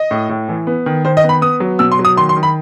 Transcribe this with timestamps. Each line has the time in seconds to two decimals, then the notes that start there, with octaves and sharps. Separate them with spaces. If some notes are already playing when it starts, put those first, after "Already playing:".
Already playing: D#5
0.11 A2
0.29 A2
0.49 E3
0.67 B3
0.86 D#3
1.05 D#3 C5
1.17 D#5
1.24 B3
1.29 B5
1.41 B3 D#6
1.60 F#3
1.79 B2 E6
1.92 C6
1.99 F#3
2.05 D#6
2.17 D#3 C6
2.29 C6
2.36 D#3
2.43 B5